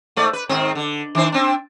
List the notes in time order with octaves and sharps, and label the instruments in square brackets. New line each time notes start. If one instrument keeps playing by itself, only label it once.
[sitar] G#2 A3 D5
B4
G#2 D#3 C4
D3
D#3 D4 C5
C4 D4